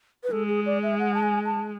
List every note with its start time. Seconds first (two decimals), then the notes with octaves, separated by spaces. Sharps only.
0.24 B4
0.31 G#3 A4
0.48 G#4
0.66 D5
0.83 E5
0.99 F#5
1.14 A5
1.23 G#5
1.45 A5